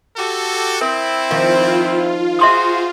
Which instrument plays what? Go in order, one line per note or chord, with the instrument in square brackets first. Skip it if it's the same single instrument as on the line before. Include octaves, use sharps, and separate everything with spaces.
[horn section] F#4 G4 A4
[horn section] C4 E4 [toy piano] A#4
[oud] D#3 F3 [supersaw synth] F4 [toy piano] F5
[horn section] F#4 G#4 C5 [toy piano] E5 C6 D#6